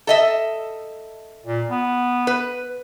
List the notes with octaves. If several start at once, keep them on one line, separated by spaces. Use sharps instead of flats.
A4 D#5 E5
A#2
B3
B4